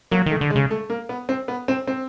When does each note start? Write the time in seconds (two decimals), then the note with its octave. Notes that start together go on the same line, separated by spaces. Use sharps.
0.11 F#3 A#3
0.26 D#3 A3
0.41 D3
0.50 G#3
0.56 C#3
0.71 A3
0.90 A#3
1.09 B3
1.29 C4
1.48 B3
1.68 C4
1.87 C4